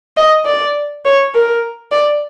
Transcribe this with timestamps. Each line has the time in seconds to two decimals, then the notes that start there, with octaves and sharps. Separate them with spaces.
0.17 D#5
0.46 D5
1.05 C#5
1.34 A#4
1.91 D5